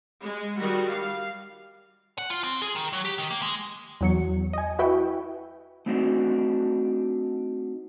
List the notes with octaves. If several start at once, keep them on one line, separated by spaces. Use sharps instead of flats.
G#3
D#3 G3 F#4
F5
F#5
F4
C4
G#4
D#3
F#3
G4
D#3
A#3
G#3
E2 F#3 C#7
D#5 G#5
E4 F#4 B4 E5 G5 C#6
A3 C4 D4 D#4 F#4